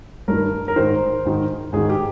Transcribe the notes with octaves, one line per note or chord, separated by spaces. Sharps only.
G2 D#3 A#4
A#4
G#2 D#3 C5
G#2 D#3
G#2 D#3 G#4
G4